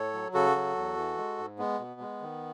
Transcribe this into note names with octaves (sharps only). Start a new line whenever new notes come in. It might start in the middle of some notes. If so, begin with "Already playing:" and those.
Already playing: A2 A4 C#5
F#3
C#3 F#4 A4
F#3
E2
E3
G#3
G#2
G#3 B3
B2
G#3
D#3